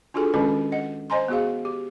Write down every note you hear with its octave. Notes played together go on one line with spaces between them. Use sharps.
D4 F4 F#4 G#4 A4 G#5
D#3 G#3 C#4 E4 A4 B4
D#5 F#5
C5 D#5 G#5 A#5 C6
B3 F#4 G#4 F5
G4